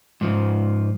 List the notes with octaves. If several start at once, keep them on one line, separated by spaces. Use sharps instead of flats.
G#2 F3